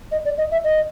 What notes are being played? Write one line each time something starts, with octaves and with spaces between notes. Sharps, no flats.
D#5
D5
D#5
E5
D#5